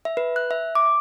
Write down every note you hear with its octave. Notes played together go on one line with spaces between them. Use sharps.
E5
B4
F#6
E5
D6